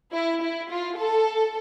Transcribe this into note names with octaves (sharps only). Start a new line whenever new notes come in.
E4
E4
F4
A4